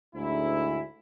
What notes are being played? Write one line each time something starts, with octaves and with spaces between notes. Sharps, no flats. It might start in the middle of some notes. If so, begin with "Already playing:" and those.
D2 G#2 E4